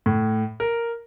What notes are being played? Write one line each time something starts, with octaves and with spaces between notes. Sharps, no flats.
A2
A#4